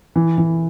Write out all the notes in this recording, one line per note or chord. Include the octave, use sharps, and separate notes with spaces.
E3
E3